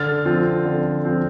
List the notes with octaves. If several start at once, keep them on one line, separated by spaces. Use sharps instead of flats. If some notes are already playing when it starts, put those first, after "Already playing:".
Already playing: D3 F6 A6
F3 C4 F4
D3
F3 C4 F4